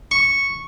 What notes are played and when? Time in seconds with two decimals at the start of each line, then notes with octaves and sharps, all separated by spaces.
0.11 C#6